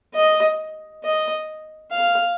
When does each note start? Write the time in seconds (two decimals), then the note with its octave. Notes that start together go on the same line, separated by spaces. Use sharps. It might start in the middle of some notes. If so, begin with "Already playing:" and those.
0.15 D#5
1.04 D#5
1.92 F5